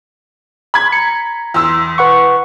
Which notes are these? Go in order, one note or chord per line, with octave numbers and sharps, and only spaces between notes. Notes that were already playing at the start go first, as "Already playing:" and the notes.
B5 G#6
A#5 C#7
E2 C6 E6
B4 F#5 C#6